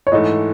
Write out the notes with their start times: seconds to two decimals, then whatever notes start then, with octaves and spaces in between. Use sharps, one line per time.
0.07 C#5
0.12 G#2 E3 A3 D#5